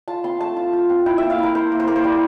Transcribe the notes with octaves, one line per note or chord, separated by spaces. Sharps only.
F4 A5
C4 C6
A3 A5
F4
F4
C4
E4 G5
A#3 E5
F5
E4 A#4
E4 C5
A#3
C5
A#3 A#4
C5
G3